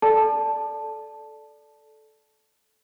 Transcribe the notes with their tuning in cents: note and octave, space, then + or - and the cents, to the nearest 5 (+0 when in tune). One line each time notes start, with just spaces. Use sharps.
A4 -15 D5 +0 A5 +0